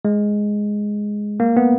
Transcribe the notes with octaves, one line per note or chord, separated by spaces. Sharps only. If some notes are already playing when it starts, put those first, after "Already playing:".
G#3
A#3
B3